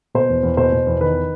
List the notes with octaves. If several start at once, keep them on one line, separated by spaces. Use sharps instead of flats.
B2 C5
E2
E2
B2 C5
B2
E2
D#3 B4